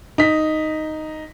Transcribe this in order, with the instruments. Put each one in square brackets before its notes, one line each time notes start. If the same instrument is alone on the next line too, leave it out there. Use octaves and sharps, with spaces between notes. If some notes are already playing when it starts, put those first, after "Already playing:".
[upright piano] D#4 B6